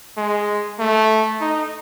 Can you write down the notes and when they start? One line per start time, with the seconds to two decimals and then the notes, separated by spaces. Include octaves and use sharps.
0.17 G#3
0.79 A3
1.41 D#4